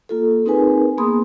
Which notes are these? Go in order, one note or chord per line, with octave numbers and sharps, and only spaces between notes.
A#3 F4 A4
C4 D#4 G#4 A#4 B4 G#5
A#3 B3 G#4 B5 C6 D#6